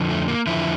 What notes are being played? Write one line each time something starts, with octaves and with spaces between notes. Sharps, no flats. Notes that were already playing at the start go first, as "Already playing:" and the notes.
Already playing: F2 D3 F3
A3
A#3
F2 D3 F3 E4